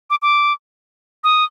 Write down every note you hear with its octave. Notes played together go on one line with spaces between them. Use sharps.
D6
D6
D#6